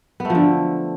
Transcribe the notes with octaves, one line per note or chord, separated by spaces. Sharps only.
D3 F3 A3 B3